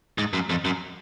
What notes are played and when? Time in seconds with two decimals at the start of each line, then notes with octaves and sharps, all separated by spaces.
0.18 G#2
0.33 F#2
0.50 F2
0.65 F#2